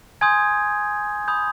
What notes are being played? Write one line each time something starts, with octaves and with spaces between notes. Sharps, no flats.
G#5 C6 D#6 G6 G#6
B5 D#6 G6